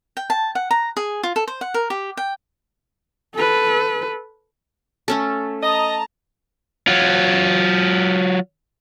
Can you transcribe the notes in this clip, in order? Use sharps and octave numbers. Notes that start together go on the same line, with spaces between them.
G5
A5
F#5
A#5
G#4
F4
A4
C5
F#5
A#4
G4
G5
A4 B4
A3 C#4 A4
D#5 A5 A#5
F#3 F4